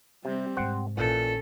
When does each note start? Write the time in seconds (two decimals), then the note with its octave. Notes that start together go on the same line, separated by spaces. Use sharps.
0.25 C3 G3 C4
0.57 G#2 C3 C5 F#5 G5
0.97 A#1 A#2 E3 C#4 A4